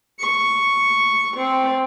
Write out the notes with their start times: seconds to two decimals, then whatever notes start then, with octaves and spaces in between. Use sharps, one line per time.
0.20 C#6
1.37 C4